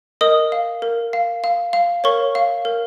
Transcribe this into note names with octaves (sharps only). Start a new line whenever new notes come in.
A#4 D#5 D#6
F5
A#4
F5
F5
F5
A#4 C#5 C#6
F5
A#4